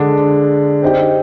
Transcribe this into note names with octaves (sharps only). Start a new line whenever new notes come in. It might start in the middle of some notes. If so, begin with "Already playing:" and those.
Already playing: D3 G#3 D4
C4 D#4 G4